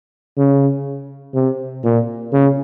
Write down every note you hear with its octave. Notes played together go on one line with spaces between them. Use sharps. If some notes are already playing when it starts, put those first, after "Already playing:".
C#3
C3
A#2
C#3